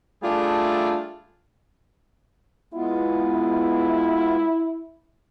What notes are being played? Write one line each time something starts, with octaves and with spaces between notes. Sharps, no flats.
G3 A3 D4 F4 G#4
G#3 B3 E4 F4